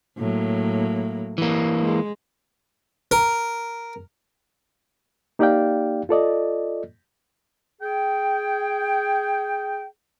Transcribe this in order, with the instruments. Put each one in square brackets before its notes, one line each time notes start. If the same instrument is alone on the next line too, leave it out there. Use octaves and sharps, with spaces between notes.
[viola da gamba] A2 F#3 A#3
[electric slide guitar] E3 A#3
[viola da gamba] G#3
[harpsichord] A#4
[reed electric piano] A#3 D#4 G4 D5 F5 G5
F4 A4 D5 D#5
[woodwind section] G#4 G5